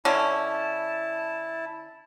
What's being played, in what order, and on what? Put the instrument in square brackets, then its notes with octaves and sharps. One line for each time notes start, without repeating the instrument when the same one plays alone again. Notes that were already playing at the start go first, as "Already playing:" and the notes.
[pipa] D3 C#4 [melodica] E4 A5